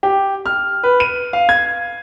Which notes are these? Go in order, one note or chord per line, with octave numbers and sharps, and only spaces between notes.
G4
F6
B4
D#7
F5
G#6